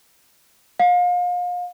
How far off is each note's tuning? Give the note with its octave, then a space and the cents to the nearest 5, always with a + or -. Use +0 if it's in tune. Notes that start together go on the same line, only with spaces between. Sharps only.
F5 +35